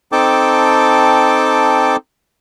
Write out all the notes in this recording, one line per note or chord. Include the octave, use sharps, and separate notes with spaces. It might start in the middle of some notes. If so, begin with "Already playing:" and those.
C4 D#4 A4 G5 A5 D6